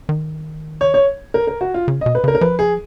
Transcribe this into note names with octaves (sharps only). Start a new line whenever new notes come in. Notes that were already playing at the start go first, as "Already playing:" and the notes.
D#3
C#5
C#5
A#4
A#4
F#4
F4
C#3
D#5
B2
B4
C#3 A#4
A#4
F3 B4
G#4